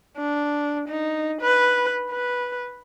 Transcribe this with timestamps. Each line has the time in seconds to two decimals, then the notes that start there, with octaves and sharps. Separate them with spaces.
0.18 D4
0.89 D#4
1.42 B4
2.11 B4